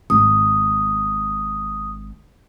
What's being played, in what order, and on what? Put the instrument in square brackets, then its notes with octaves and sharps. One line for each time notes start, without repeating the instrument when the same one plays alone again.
[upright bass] G#1 [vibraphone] D#6